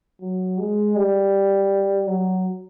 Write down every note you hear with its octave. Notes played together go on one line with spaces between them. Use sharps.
F#3
G#3
G3
F#3